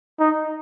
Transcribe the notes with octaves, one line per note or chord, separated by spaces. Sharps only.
D#4